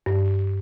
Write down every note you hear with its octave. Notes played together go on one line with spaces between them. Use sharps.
G2